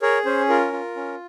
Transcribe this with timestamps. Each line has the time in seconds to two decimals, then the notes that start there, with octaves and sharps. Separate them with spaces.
0.02 G#4 A#4 C#5
0.25 C#4 C5
0.49 F4 A#4
0.73 F4
0.96 C#4